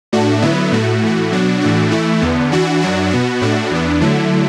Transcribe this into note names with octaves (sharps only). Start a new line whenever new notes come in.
A2 A3 D4 F#4
D3 F#3 B3 E4
A2 A3 F#4
A2 E3 A3 F#4
B2 F#3 D4 F#4
A2 E3 A3 D4 F#4
E3 A3 E4
E2 D3 B3
E3 D4 F#4
F#2 F#3 D4 F#4
B2 B3 F#4
A2 A3 D4 F#4
E2 E3 B3 D4
D3 F#3 A3 E4